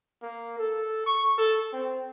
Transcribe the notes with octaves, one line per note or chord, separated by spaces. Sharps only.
A#3
A4
C#6
A4
C4